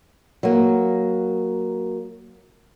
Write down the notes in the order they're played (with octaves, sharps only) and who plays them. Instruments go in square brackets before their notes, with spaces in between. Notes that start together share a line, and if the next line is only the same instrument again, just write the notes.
[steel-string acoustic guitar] F#3 A#3